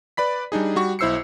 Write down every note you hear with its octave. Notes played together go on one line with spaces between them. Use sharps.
B4 D5 B5 B6
G3 D4 D#4 G#4
G3 F#4 C#6
B1 E4 C5 E6 C7 C#7